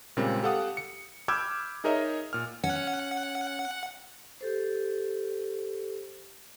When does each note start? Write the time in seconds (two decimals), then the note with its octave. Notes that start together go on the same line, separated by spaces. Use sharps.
0.17 A#2 C#3 G3 G#3 A#3 C4
0.43 G4 A4 F5 F#5 D#6
0.77 C#7
1.28 B5 D6 E6 F6 G6 G#6
1.84 D#4 G#4 A#4 C#5 D#5 E5
2.33 A#2 F6
2.64 C#4 F#5
4.41 G4 A4 C5